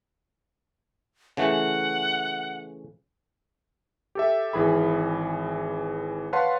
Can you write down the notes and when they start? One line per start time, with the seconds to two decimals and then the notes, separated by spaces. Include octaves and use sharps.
1.37 C#3 E3 A3 F#5
4.15 G4 A4 E5
4.53 G#1 E3 G#4 B5
6.33 B4 C#5 F5 F#5 A5 C6